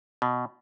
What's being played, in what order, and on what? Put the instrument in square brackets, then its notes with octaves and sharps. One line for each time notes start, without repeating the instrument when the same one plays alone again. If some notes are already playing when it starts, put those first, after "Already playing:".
[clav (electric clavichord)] B2